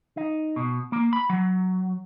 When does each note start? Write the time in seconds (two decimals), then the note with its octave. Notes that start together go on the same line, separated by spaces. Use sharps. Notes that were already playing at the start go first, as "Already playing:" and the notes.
0.17 D#4
0.56 B2
0.92 A#3
1.13 B5
1.29 F#3